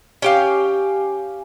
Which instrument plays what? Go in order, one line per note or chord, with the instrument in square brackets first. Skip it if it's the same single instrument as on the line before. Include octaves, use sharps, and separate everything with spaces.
[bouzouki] C#4 G4 F5